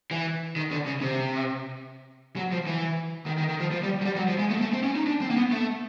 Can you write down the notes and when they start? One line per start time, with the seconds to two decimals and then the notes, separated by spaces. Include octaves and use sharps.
0.11 E3
0.56 D#3
0.71 D3
0.86 C#3
1.02 C3
2.36 F#3
2.52 F3
2.67 E3
3.26 D#3
3.38 D#3
3.49 D#3
3.60 F3
3.72 F3
3.83 G3
4.01 F#3
4.05 G3
4.16 F#3
4.28 F3
4.39 G#3
4.50 A3
4.57 A#3
4.61 A3
4.73 C4
4.84 C#4
4.96 D#4
5.07 D4
5.21 C4
5.30 A#3
5.37 B3
5.51 A3